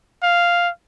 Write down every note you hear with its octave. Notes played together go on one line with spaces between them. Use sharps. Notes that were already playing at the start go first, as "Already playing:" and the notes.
F5